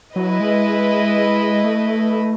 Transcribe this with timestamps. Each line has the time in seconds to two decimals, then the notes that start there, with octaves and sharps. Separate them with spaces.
0.16 F#3 E4 B4 D#5
0.40 G#3
1.64 A3